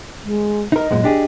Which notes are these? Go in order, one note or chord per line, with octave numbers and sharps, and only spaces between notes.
G#3
D#4 A#4 D#5
F#2 A#2 G#3
D4 G4 G#4